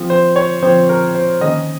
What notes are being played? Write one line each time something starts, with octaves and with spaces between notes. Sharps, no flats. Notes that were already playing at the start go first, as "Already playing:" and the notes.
Already playing: F3 C4
C5
C#5
F3 C4 C5
A#4
C5
D#3 A#3 C#4 D#5